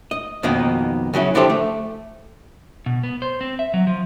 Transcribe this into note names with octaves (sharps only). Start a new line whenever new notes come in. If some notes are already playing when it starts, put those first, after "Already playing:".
D#5
F2 B2 D#3 A#3 B3 D#4
C#3 F#3 C#4 E4
D3 F3 E4 G4 A4
A3
B2
B3
C5
C4
E5
F#3
F3